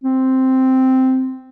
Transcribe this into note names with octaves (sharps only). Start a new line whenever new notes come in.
C4